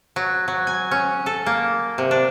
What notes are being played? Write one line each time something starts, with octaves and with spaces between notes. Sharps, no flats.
F#3
F#3
G#5
C#4
A4
A#3
C3
D4